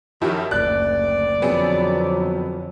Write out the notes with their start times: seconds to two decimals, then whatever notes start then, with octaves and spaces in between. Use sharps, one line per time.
0.22 F#2 D#3 F3 E4 G4
0.51 F#1 D2 D5 F#6
1.42 F2 D3 F#3 B3 C4 G#4